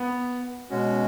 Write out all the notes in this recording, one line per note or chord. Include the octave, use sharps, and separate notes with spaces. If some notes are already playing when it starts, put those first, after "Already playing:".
Already playing: B3
B2 G#3 C#4 F#4